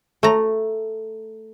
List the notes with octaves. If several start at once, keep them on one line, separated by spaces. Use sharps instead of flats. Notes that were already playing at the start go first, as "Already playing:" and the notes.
A3 A#5